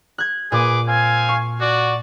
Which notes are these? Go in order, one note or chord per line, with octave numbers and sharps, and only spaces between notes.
F#6 G#6
A#2 G#4 B4 D6
C4 F5 G#5
C#6
F#4 D5